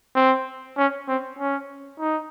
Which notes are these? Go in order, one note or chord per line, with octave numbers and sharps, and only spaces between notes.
C4
C#4
C4
C#4
D#4